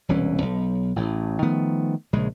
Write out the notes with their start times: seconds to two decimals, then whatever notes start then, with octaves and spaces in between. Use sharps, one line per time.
0.09 E1 C2 E3 C#4
0.42 B1
0.96 A1 A2
1.42 D#3 F3 A3 B3
2.13 A#1 C#3 G#3